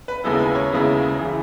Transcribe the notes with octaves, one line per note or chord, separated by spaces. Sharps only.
B4
D#2 C#3 G#3 B3 E4 A4
B4
C#5
D#2 C#3 G#3 B3 E4
C#3 E3